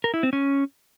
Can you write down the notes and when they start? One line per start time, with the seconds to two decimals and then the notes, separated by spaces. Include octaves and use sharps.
0.04 A#4
0.14 E4
0.23 C4
0.33 C#4